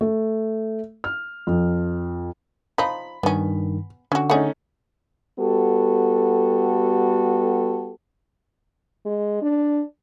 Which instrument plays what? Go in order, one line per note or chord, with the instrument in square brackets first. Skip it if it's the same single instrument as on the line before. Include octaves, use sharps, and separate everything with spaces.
[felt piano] A3
F6
F2
[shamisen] F3 D#4 [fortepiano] B5
[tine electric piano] G2 D#3 [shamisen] B3 C#4
[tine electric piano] D3 [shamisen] C#4 F#4
[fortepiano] A3 C#4 D#4 [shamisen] G#4 F#5
[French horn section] G3 B3 F#4 G4 A4
[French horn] G#3
D4